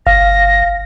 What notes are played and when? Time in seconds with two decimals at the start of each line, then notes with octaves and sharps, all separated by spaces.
0.07 G1 F5 A#6